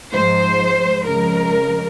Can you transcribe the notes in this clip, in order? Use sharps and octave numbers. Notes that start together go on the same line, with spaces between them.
G#2 F3 G#3 C5
F2 C#3 F3 G#3 A#4